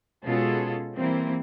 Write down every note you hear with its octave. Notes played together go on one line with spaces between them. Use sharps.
B2 G#3 C#4 F4 G#4 A4
E3 G3 A#3 C4 E4